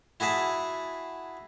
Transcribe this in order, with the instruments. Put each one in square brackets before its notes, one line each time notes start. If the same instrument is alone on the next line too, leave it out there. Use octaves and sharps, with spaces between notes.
[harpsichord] E4 F#4 G#4 E5 A5